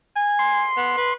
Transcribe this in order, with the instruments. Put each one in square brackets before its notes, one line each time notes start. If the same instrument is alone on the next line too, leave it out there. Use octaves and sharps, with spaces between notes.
[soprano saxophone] G#5
[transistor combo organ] C6
[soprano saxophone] B3
B4